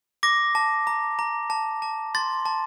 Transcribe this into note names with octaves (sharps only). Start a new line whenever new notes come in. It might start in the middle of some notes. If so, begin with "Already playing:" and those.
D6 A#6
A5
A#5
A#5
A5
A5
C6 A6
A5